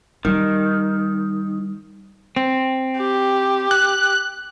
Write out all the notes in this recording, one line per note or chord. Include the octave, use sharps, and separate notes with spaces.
D#3 G3
C4
G4
F#6